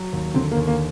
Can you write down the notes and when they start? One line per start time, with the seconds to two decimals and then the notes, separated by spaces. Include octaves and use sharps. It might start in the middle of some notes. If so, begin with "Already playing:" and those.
Already playing: F#3
0.13 D#2
0.34 D3 C4
0.52 A#3
0.57 D#2
0.68 A#3